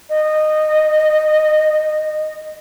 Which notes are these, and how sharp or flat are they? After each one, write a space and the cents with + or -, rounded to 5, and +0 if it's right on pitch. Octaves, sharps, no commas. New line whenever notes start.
D#5 -15